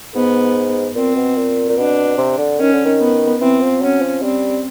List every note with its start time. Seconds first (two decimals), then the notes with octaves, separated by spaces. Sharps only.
0.14 G#2 B3
0.95 A#2 C4
1.16 B2
1.37 A#2
1.69 A#2
1.77 B2 D4
2.18 C3
2.38 D3
2.59 D#3 C#4
2.73 D3
2.85 D#3
3.00 B3
3.41 E3 C4
3.61 F3
3.81 F#3 C#4
4.02 F3
4.23 G3 C4